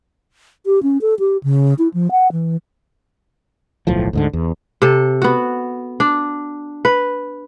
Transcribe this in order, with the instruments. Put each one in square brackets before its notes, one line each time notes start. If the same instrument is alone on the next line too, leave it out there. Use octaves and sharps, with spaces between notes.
[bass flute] G4
C#4
A4
G4
C#3
E4
F3
F#5
E3
[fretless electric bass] D1 B1 A2 F3
D2 G#2 D3
E2
[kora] C3 A4
B3 F#4
D4
B4